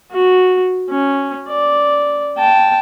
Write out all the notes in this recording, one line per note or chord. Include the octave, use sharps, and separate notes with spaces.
F#4
C#4
D5
G5 A5